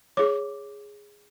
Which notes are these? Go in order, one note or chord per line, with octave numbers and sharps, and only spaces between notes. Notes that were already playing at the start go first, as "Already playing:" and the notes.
G#4 C#5 D6